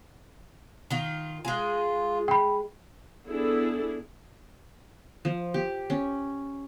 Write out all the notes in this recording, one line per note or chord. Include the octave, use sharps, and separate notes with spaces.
D#3 F4
G#3 F4 G#4
G5 B5
B3 D4 E4 G#4 A4
F3
G4
C#4